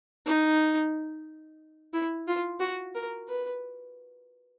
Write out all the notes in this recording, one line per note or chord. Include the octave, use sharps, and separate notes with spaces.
D#4
E4
F4
F#4
A#4
B4